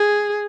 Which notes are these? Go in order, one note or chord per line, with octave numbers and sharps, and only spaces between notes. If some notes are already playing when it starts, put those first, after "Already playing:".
Already playing: G#4